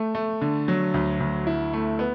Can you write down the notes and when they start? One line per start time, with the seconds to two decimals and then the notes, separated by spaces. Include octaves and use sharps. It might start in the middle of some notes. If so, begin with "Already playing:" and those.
Already playing: A3
0.15 A3
0.42 D3
0.68 F#3
0.94 D2
1.20 D2
1.47 E4
1.73 A3
1.99 B3